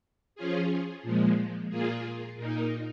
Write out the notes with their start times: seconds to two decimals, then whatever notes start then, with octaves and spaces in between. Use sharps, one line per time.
0.35 F3 C#4 F4 G#4
1.03 A#2 F3 G#3
1.70 A#2 A#3 F4 G#4
2.37 A#2 A#3 D#4